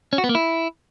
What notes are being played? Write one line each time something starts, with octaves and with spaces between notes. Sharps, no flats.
C#4
F#4
B3
A#3
E4